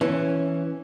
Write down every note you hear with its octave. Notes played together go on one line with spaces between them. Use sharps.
E3 C#4